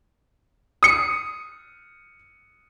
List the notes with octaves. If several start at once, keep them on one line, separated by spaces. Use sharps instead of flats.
D#6 C#7